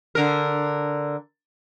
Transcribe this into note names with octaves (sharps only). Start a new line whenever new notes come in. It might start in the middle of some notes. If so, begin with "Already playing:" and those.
D3 A#4